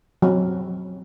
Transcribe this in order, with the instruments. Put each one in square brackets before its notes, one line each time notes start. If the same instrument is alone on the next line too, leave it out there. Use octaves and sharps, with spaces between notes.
[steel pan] F#3 C4